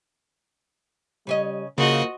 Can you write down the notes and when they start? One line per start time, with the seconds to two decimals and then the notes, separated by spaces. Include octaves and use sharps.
1.27 C#3 G3 C#4 D#5
1.78 C#3 F3 A#3 F#4 D#5